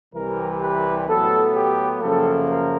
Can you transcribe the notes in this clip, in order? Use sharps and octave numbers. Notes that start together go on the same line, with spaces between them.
C2 C3 E3 G3 A#4
B4
A2 F#3 B3 A4
G4
F#2 C#3 F3 A#3 A4
A#4